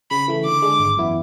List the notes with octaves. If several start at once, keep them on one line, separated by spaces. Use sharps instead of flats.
C#3 B5
E3 A3
D3 D6
G#3 D4
G#1
F#2 E3 B3 E4